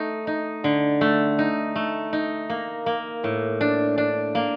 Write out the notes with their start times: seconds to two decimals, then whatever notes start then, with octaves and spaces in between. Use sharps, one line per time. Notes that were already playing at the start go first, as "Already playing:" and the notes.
Already playing: A3 D#4
0.27 D#4
0.64 D3
1.01 A3
1.39 D#4
1.76 A3
2.13 D#4
2.49 A#3
2.86 A#3
3.24 A2
3.61 D4
3.98 D4
4.35 A#3